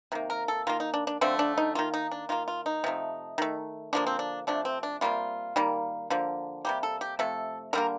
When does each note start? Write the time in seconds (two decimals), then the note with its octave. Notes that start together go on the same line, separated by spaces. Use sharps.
0.12 C3 D#3 A#3
0.30 A#4
0.48 A4
0.67 D#3 A#3 F4
0.80 D#4
0.94 D4
1.07 D4
1.21 D3 F3 A3 C4
1.39 D4
1.58 D#4
1.75 D#3 A#3 F4
1.94 D#4
2.11 D4
2.29 D#3 A#3 F4
2.48 F4
2.66 D#4
2.84 C3 F3 A3
3.38 D#3 A3
3.93 D3 F3 A#3 D4
4.07 C4
4.19 D4
4.47 C3 F3 A3 D4
4.65 C4
4.83 D4
5.01 C3 D#3 G3 A#3 F4
5.56 D#3 G3 A#3
6.10 D3 F3 A#3
6.65 C3 G3 A#3 G4
6.83 A4
7.01 G4
7.19 C3 F3 A3 A4
7.73 D3 G3 A#3 A#4